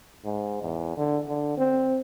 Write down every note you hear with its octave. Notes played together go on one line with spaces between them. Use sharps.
G#2
E2
D3
D3
C4